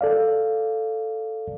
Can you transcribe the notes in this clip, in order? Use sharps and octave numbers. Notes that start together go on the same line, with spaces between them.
A4 D5 F5